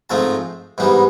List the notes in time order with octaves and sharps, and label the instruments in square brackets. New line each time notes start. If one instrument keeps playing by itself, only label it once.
[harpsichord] G#2 F3 A3 C4 D#4 A5
G#2 E3 G3 B3 D#4